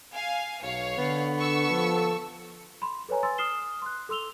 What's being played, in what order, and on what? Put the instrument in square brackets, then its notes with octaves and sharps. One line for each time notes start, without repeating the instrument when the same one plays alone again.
[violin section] F5 G#5
[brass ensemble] B1 [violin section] C#5 F5
[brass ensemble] D3 [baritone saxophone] B3
[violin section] C#6 E6
[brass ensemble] F3 A4
[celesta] B5 C6
A4 B4 C#5 G#5 A#5
G#5 C6 E6 A6
D#6 F6 C7 E7 G7
C6 F#6
A4 C6 E6 F7 G7